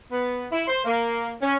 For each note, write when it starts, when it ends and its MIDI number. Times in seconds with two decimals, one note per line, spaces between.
0.12 0.46 59
0.51 0.65 64
0.67 0.81 72
0.84 1.32 58
1.42 1.57 61